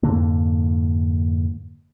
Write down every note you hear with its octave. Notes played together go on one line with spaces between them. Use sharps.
F2 G#2 D3 A#3